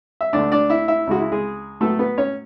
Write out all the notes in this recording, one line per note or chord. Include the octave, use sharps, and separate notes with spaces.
E5
D2 D3 A3 D4 D5
D4 D5
E4 E5
E4 E5
C#2 C#3 G#3 F#4
E4
G#3 G#4
A2 F#3 A3 B3 A4
B3 B4
C#4 C#5